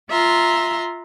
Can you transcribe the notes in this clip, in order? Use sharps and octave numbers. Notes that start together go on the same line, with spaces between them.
F4 E5 A#5 C6